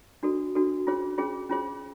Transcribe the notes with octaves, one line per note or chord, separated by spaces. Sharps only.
D4 F#4 A4
D4 F#4 A4
C#4 F4 G#4 C5
C#4 F4 G#4 C5
C#4 F4 G#4 C5